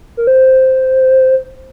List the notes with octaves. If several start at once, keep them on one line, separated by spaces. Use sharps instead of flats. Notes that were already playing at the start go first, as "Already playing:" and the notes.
A#4
C5